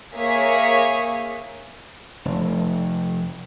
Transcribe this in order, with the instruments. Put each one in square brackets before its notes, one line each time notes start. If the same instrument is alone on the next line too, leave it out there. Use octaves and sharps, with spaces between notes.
[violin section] A#3 G#4 C#5 E5 B6
[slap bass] F1